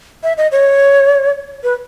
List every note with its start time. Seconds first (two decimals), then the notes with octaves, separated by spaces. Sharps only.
0.23 E5
0.37 D#5
0.52 C#5
1.63 B4